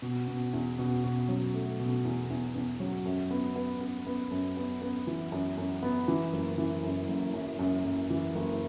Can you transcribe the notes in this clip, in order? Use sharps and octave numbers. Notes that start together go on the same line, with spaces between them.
B2
B2
E2
B2
B2
F#3
A3
B2
E2
E2
E2
F#3
F#2
B3
B3
B3
B3
F#2
B3
B3
E3
F#2
F#2
B3
E3
F#1
E3
F#2
F#1
F#2
F#2
F#1
E3
F#1